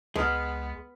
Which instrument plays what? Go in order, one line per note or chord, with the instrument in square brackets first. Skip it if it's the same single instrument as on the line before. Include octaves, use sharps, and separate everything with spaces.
[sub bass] C#2 [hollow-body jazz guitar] G#3 [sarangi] B3 [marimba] B4 D#6 F6